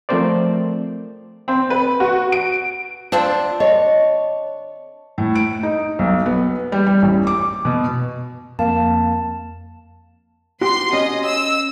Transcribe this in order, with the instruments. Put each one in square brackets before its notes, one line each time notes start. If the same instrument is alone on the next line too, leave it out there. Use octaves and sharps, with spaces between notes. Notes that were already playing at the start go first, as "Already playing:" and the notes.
[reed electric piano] F3 A3 C4 A#4 C5 D5
[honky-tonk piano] C4
B4
F#4
D7
[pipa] D3 C4 D4 [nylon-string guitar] F4
[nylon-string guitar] C#5 [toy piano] D#5
[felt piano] A2
D7
D#4
B1
B3
G3
G3
A1
D6
B2
[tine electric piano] F2 A#3 F5 [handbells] A5
[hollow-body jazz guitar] F#4 G4 [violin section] C6
[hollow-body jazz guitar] C#4 [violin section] D#5
[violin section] E6